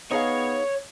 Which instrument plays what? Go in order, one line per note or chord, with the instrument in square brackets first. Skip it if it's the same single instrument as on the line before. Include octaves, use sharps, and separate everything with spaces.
[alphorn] B3 [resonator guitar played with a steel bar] D#4 G#4 F5 [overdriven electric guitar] C#5